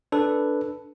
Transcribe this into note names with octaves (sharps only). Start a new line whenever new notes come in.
D4 A4 B4